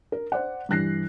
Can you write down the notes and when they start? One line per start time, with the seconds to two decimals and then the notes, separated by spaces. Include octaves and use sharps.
0.12 A#4
0.32 C5 D5 F#5
0.69 G2 E3 F#6 A#6 C7